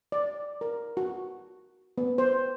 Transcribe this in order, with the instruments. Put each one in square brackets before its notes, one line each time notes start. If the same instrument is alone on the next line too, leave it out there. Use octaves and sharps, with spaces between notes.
[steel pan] D5
A#4
F#4
B3
C5